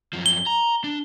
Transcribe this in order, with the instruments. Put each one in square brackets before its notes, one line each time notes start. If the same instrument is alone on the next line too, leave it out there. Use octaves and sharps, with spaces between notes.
[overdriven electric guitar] F#2 F3
[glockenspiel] G7
[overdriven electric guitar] A#5
D4